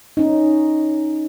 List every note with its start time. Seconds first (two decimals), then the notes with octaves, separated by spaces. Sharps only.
0.17 C#4 D#4